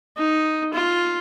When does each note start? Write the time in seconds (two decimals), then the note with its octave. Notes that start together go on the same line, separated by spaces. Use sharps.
0.18 D#4
0.73 F4